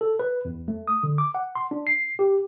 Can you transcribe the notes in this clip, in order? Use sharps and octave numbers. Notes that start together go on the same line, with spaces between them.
A4
B4
E2
A3
D#6
D3
D6
F#5
C6
D4
C7
G4